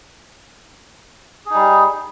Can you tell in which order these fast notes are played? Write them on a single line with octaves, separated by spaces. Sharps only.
G#4 D#4 G3